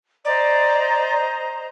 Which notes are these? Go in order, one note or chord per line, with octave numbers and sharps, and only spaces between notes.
C5 D5 D#5 A#5